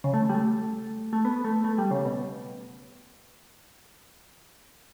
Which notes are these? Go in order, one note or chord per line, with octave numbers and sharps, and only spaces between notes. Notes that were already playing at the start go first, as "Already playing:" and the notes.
C#3
A3
G3
A3
A3
B3
A3
A3
G3
C#3
B2